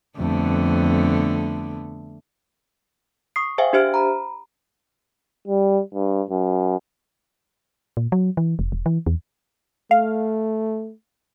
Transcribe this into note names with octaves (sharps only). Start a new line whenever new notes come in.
F2 D3 A3 B3
C#6 D#6 C7
G#4 C5 E5 F5 G5 G#5
D4 G4 C5 E5 F6 D7
A#5 B5
G3
G2
F#2
A#2
F#3
E3
F1
E1
E3
E2
A3 F5